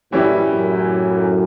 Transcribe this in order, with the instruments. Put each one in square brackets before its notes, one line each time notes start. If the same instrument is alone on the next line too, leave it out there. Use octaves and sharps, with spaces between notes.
[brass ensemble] F#2 A2 [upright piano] E3 G3 C#4 E4 G4
[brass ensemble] F#2 A2